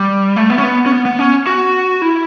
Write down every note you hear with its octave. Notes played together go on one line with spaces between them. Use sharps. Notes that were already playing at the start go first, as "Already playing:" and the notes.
Already playing: G3
A3
B3
C#4
B3
C#4
B3
B3
C#4
F#4
E4